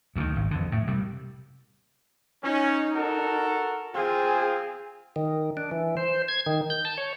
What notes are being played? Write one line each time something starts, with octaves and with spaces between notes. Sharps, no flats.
D2 D3 D#3
G#1
F2 D3
A2
C3 G3
C#4 D#4
F#4 A4 A#4
C4 F4 G#4
D#3
D4
E3
C5
G#6
D#3
G6
A5
C#5